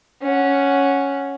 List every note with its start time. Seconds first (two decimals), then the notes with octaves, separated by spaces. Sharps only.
0.22 C#4 F#5